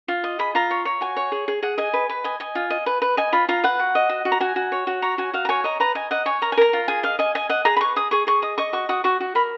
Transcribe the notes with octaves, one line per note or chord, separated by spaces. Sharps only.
F4
D#5
G#4 B5
F4 A#5
C#5
C#5
F#4 G#5
C#5
G#4
G#4
G#4 F#5
D#5 G#5
B4
B4
D#5 G#5
D#5 G#5
F4
D#5
B4
B4
D#5 G#5
F4 B5
F4 A#5
B4 F#5
F#4
D#5
F#4
F#4
A#5
F#4 G#5
F#4
C#5
F#4
C#5 A#5
F#4 G#5
F#4 F5
A#5
C#5 G#5
D#5 A#5
B4 A#5
D#5 G#5
D#5 F#5
C#5 G#5
A#4 A#5
G#5
A#4 A#5
F4
G#4 G#5
D#5 F5
D#5 G#5
D#5 G#5
D#5 F#5
G#4 A#5
B5
B4 C#6
G#4 D#6
G#4 C#6
G#4 C#6
D#5 D#6
D#5 C#6
F#4 C#6
F#4 D#6
F#4 C#6
F#4
A#4 B5